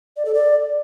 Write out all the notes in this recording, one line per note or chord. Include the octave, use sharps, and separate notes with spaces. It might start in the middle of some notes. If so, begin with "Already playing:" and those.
D5
A4
D5